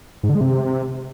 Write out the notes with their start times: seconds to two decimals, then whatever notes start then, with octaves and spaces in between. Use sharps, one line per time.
0.23 G#2
0.29 D3
0.35 G#3
0.41 C3